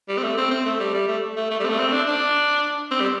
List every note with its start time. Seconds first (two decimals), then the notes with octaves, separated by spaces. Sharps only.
0.09 G3
0.18 C4
0.23 A3
0.37 C4
0.51 C4
0.65 A3
0.79 G3
0.94 G3
1.08 A3
1.36 A3
1.50 A3
1.59 G3
1.65 C4
1.69 A3
1.79 C4
1.92 D4
2.07 D4
2.91 C4
3.01 G3